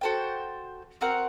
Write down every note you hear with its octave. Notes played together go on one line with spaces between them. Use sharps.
F#4 A4 C5 G5
C4 F#4 A#4 F#5